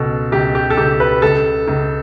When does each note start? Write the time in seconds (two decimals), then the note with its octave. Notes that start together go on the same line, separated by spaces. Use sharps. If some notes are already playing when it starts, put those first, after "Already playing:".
Already playing: C#2 B2 A4
0.32 C#2 G4
0.55 G4
0.70 A4
0.77 C#2 G4
1.00 B4
1.22 C#2 A4
1.68 C#2